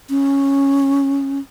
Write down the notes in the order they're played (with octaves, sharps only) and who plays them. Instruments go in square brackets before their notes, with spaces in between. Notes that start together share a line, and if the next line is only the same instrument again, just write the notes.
[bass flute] C#4